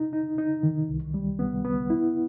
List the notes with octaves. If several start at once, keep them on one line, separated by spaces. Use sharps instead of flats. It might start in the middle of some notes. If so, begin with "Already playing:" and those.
Already playing: D#4
D#4
D#4
D#3
C2
G3
B3
B3
E4